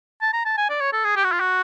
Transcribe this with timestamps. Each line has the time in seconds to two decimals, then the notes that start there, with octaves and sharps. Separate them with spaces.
0.21 A5
0.33 A#5
0.45 A5
0.57 G#5
0.69 D5
0.80 C#5
0.92 A4
1.04 G#4
1.16 G4
1.24 F#4
1.32 F4
1.40 F#4